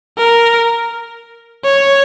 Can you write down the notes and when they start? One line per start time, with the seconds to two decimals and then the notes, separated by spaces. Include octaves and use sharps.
0.18 A#4
1.64 C#5